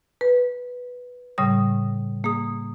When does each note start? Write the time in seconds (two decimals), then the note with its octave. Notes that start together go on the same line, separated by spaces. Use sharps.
0.21 B4
1.38 A2 C#3 G3 D#6
2.24 A#3 G#4 D#6